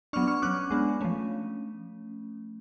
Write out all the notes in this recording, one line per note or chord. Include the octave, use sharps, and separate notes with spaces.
F#3 B3 D4 C#6 F6
C#6 F6
F#3 C#4 D6 F#6
G#3 B3 D4
F3 A3 C#4